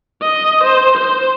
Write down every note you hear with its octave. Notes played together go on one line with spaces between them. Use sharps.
D#5
C5
C5